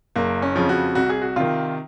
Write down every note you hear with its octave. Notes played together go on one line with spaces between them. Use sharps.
F#1 A#3
C#4
F2 C#3 F3
F#4
C2 F#4
G#4
F#4
C3 D#3 F4